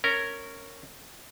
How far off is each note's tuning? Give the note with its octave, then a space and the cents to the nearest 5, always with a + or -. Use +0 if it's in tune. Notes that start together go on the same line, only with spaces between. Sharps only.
C#4 +0 A#4 -15